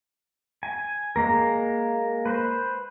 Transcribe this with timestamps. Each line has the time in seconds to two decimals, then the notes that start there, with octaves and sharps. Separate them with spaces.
0.63 G#5
1.16 G#3 A#3 A#4
2.26 B4 C5